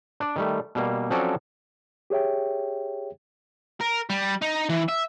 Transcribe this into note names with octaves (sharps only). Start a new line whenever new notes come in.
D4 D5
D#3 G3 A3
B2 G3 A#3
F3 F#3 C4 C#4 A4 D5
G4 G#4 C#5 E5 G5
A#4
G3
D#4
E3
E5